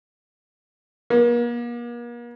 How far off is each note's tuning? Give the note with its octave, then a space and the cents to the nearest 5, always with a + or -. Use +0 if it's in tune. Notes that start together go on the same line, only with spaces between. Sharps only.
A#3 +40